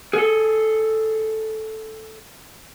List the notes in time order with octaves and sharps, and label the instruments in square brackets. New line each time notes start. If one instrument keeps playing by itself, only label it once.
[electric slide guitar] G#4 A4